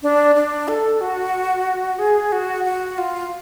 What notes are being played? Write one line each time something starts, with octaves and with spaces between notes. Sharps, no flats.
D4
D4
A4
F#4
G#4
F#4
F#4
F4